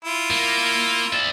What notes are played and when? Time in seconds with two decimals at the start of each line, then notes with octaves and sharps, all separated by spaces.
0.05 E4 F4
0.31 A#3
1.13 D5 E5